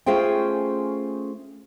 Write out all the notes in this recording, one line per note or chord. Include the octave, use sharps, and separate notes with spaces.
A3 C#4 F4 G#4 C5 G5